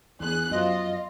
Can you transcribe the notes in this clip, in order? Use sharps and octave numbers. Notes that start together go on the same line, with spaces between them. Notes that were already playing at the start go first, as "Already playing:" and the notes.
E2 B3 G#4 F#6
F#2 F3 F4 D#5